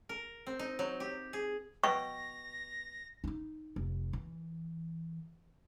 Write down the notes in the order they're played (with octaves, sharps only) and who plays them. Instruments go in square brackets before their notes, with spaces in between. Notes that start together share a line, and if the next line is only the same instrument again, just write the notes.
[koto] A#4
C4
D#4
F#3
G4
G#4
[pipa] B2 [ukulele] G5 [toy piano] C#6 [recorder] A#6
[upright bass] D#4 E4
F1
E3